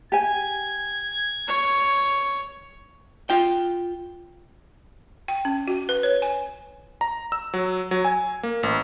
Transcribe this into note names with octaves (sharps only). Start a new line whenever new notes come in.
G4 G#5 G#6
C#5
F4 G5
G5
C#4
F#4
B4
C#5
G#5
A#5
E6
F#3
F#3
G#5
A#3
A1